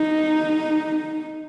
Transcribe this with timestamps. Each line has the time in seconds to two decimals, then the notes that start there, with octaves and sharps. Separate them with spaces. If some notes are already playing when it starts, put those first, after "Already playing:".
Already playing: D#4